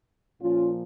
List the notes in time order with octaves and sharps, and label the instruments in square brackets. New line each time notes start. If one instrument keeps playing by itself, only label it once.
[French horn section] A#2 F3 C#4 F4